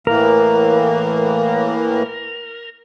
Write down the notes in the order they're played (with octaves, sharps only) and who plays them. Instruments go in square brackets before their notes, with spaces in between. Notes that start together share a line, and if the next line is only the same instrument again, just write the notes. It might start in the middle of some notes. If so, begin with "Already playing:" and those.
[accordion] A2 E3 A#3 [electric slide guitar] A#4